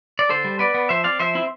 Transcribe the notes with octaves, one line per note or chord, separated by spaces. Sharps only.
D5
D3 A4 C5
G3
B3 B4 D5
B3
F3 C5 E5
C4 D5 F5
F3 C5 E5
C4 E4